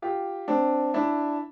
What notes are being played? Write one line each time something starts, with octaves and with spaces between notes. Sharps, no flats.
F4 G4
C4 D4
D4 E4